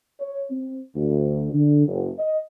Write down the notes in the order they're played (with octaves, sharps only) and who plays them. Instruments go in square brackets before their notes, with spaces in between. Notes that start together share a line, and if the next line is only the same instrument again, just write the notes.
[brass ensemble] C#5
C4
D2
D3
F#1
D#5